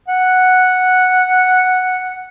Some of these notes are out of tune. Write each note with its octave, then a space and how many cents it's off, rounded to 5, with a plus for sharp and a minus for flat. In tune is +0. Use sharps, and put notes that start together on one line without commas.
F#5 -5